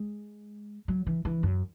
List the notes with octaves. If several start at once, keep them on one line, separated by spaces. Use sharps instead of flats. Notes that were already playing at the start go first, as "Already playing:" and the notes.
Already playing: G#3
F#3
E3
E3
F#2